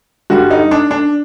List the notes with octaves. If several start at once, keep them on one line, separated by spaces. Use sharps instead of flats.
G2 D3 G3 F#4
D#4
D4
D4